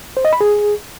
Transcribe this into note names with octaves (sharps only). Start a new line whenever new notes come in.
C5
D#5
B5
G#4